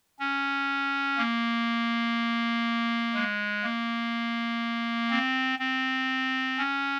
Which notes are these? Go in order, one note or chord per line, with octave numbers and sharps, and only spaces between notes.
C#4
A#3
G#3
A#3
C4
C4
C#4